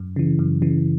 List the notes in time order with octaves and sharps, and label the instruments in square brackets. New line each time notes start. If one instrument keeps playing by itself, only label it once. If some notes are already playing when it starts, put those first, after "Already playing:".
Already playing: [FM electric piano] F#2
C#3 E3
F#2
C#3 E3